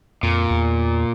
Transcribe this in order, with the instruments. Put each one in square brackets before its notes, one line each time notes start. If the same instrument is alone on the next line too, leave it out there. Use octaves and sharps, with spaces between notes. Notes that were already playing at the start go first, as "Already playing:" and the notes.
[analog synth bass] F2 [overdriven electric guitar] A#2
[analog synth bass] E2